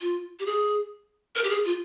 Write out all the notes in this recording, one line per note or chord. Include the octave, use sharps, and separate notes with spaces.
F4
G4
G#4
A#4
G4
G#4
F4